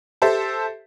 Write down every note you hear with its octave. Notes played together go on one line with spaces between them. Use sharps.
G4 A4 C5 E5